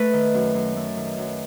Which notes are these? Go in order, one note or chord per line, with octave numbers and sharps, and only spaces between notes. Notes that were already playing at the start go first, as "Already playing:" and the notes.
Already playing: A3 B4
D#3
F#2
F#2
A3
D#3
F#2